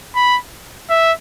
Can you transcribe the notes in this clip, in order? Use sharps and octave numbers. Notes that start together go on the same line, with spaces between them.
B5
E5